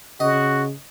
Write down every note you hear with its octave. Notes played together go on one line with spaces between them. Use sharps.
C#3 F#4 D#5